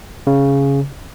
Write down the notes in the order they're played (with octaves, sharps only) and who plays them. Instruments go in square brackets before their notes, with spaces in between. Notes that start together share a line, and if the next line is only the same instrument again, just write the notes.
[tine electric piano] C#3